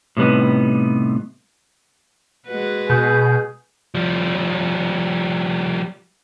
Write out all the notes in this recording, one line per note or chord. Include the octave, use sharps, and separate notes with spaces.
A2 C3 G3 B3 D#4
G#3 F#4 B4
B2 G#4 G6
F3 G3